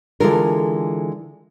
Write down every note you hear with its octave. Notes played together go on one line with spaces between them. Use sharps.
D3 E3 G#3 F4 A4 A#4